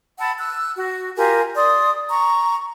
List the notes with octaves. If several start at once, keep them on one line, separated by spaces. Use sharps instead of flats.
F#5 A5 B5 E6
E6 F#6
F#4
F4 G4 A#4 G#5
D5 C6 D#6
A#5 C#6